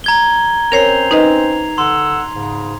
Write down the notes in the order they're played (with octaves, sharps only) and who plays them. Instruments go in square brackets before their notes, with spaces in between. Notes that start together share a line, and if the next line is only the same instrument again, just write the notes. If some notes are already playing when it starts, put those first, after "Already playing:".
[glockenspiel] A#5 G#6 G7
[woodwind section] C4 C#4 C5 [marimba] A#4 C#5 [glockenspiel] C7 F7
[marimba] D#4 B4 D#5
[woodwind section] D3 F#5 E6 [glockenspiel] C6
[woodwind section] G#2 C#3